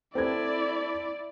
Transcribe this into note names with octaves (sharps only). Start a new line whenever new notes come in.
C4 E4 A4 D5 G#6